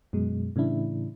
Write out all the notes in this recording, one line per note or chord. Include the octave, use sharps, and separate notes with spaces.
F#2 B2 G#3
A2 C#3 E3 D4 E4